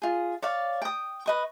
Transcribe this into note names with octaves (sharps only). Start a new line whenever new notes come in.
F4 G#4
C#5 D5 F5
G5 D#6
B4 D#5 C#6